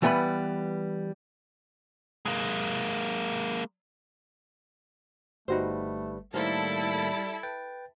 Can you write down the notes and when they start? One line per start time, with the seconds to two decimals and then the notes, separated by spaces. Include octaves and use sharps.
0.02 E3 G3 B3 B4 B5
2.26 G#3 A#3
5.48 G1 G3 A3 D#4 F#4 B4 C5
6.34 A2 D#3 G3 A#3 E4 A4 A#4 C5
7.43 B4 G5 A6